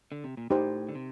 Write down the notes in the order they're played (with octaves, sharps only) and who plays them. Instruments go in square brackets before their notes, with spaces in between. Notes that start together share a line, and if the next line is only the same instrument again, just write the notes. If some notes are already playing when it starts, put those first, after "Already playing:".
[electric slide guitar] D3
C3
A#2
[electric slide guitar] A2 [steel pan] D#4 G4 C5
[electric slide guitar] D3
C3